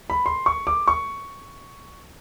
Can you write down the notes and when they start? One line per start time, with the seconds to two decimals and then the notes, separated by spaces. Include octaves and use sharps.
0.10 B5
0.26 C6
0.46 C#6
0.67 D6
0.88 C#6